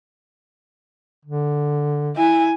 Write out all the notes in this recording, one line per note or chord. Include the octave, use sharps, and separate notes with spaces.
D3
E4 G#5